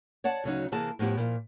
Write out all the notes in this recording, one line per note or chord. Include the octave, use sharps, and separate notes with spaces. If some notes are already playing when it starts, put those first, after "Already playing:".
C#5 D5 F#5 A5
D2 C#3 F#3 D#4
C3 E3 A#3 G#4 A5
A2 F3 B3 E4 G4
A#2 F3